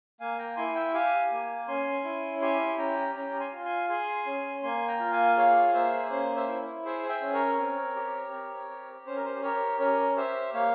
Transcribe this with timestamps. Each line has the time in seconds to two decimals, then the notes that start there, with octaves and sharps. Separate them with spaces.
0.20 A#3 F5 G#5
0.38 G5 A#5
0.56 E4 G#5 C6
0.75 E5 G5
0.94 G4 F5 G#5
1.31 A#3
1.68 C#4 G#5 C6
2.04 E4
2.41 G4 G#5 C6
2.78 C#4 G5 A#5
3.15 C#4 G5 A#5
3.40 G#5 C6
3.52 F4
3.65 G#5 C6
3.89 G#4 G#5 C6
4.26 C#4
4.63 A#3 G#5 C6
4.87 G5 A#5
5.00 F4
5.12 F5 G#5
5.36 G#4 C#5 F5
5.73 A#3 C5 E5
6.10 C#4 C5
6.36 C5 E5
6.48 E4
6.85 G#4 C5 E5
7.09 E5 G5
7.21 C#4
7.33 A#4 C#5
7.58 C4
7.96 G4
8.32 C4
8.70 G4
9.06 C#4 C5
9.16 A#4
9.25 C5
9.43 G4 A#4 C#5
9.80 C#4 A#4 C#5
10.16 G4 C5 E5
10.54 A#3 C#5 F5